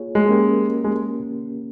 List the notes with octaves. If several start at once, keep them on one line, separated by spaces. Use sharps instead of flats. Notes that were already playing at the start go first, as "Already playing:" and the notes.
Already playing: A#3 F4 G#4 C#5
G#3
A#3 C#4 G4 A#4
G#3